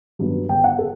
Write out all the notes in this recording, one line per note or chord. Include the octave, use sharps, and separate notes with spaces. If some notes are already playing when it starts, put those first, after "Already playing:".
G2 F#3 B3
G1 G5
F#5
A4